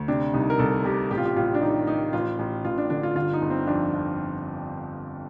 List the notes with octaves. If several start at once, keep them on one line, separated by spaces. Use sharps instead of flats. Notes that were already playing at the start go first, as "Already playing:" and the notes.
Already playing: D2
C3 D4
C2 D#4
A#4
C2 A4
C3 G4
A1 G4
F4
G4
A1 F4
D4
D#3 D#4
D#3 D#4
A1 F4
A1
A1 F4
D4
D3 D4
F4
G1 F4
D#4
G1
C4
F2 D4
F2